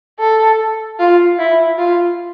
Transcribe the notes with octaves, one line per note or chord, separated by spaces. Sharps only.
A4
F4
E4
F4